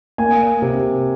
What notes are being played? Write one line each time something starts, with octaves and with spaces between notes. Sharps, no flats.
A#3 G#5
C3